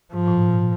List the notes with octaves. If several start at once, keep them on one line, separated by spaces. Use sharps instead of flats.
G#2 F3
A2
A#2